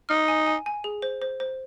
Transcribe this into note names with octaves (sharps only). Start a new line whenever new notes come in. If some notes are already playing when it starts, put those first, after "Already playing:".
D#4 F6
G#5
G#5
G#5
G#4
C5
C5
C5